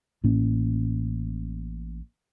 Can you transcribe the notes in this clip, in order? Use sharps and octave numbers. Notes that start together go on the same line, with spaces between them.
A1 A2 A#3 C#4